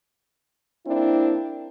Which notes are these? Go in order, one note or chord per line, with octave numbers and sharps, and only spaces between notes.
A#3 C4 D4 E4